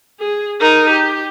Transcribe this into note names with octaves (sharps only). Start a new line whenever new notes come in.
G#4
D#4 A#4
G4